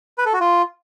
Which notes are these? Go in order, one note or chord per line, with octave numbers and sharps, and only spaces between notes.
B4
A4
F#4
F4